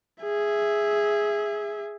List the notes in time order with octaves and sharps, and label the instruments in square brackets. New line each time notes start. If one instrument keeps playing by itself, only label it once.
[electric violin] G#4 E5